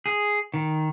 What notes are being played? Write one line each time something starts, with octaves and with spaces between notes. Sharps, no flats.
G#4
D#3